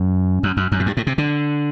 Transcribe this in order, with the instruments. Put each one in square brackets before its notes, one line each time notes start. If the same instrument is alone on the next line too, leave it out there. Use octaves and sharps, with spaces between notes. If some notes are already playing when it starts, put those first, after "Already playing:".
Already playing: [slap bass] F#2
F#2
F#2
F#2
A2
G2
A2
C3
D3